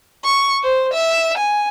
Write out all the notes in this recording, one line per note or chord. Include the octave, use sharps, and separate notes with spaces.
C#6
C5
E5
G#5